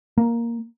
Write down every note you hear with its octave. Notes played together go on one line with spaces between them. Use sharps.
A#3